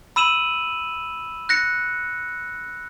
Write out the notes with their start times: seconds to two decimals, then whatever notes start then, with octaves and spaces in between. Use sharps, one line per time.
0.16 B5 E6 D#7 E7 F#7
1.49 F#6 A#6 C#7